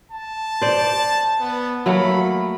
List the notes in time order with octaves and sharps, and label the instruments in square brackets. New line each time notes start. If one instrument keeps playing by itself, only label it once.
[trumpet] A5
[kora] C5 D5
[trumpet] B3
[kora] F#3 A3 A#3 [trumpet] B5